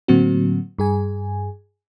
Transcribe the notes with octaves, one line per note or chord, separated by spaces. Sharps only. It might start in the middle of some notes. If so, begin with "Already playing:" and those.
A2 D3 F#3 A#3 C4 F#4
G2 G#4 G#5